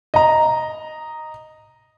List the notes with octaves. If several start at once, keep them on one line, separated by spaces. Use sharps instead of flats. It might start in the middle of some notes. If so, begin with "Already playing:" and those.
D#5 A#5